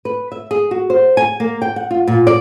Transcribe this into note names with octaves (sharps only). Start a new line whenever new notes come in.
B4
E5
G#4
F#4
C5
G#5
A#3
G5
F#5
F4
A#2
D5